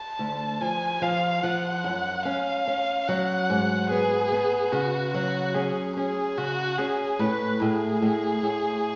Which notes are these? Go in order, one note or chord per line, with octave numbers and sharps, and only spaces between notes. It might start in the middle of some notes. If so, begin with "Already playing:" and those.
Already playing: A5
D2
F3 G#5
F3 F5
F3 F#5
F#2
C#4 F5
C#4
F#3 F#5
G#2
B3 G#4
B3
C#3 F#4
F#3 F#4
C#4 G#4
C#4 G#4
C#3 F#4
C#4 G#4
A2 B4
A2 G#4
A2
A2